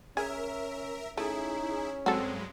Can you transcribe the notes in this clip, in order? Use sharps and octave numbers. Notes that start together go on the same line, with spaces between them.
C#4 G#4 A#4 E5
A3 C#4 D#4 E4 G#4
G2 F#3 G#3 C4 F#4 A4